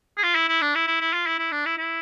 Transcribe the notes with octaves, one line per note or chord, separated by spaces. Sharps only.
G#4
F4
E4
E4
D4
E4
E4
E4
F4
E4
E4
D4
E4
E4